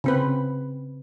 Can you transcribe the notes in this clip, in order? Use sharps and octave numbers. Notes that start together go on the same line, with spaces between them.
C#3 C4 B4